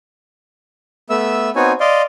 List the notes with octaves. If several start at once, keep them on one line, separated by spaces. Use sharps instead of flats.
A3 B3 E5 E6
B3 C4 D#4 F#4 C#5 G#5
D5 D#5 F5 C6